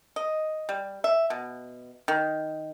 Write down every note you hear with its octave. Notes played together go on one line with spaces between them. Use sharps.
D#5
G3
E5
B2
D#3